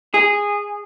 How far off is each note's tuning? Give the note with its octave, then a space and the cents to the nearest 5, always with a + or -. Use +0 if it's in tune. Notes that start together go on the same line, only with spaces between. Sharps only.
G#4 -15